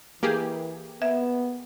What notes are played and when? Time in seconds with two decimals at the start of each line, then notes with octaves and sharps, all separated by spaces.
0.23 E3 A#3 G4 G#4
1.02 B3 E5